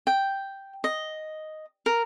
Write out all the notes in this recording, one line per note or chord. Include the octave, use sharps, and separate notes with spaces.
G5
D#5
A#4